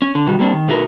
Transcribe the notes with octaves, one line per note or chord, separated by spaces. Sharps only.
C#4
D3
B2 D#3 G3 F#4
G3 A#3 C4 D4
D#3
B2 A3 D#4 F#4 A#4 B4